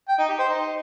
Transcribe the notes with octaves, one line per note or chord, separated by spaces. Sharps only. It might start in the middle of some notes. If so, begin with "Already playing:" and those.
G5
D#4
G4
C5
D#4